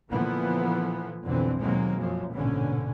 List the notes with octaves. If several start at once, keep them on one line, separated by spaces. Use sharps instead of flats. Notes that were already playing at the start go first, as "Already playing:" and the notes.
A#2 D3 E3 F3 A#3 B3
B1 F2 B2 D3 E3 C4
D#2 B2 F#3 G#3 A#3 C4
F#2 F3
A#1 G#2 B2 D3 C#4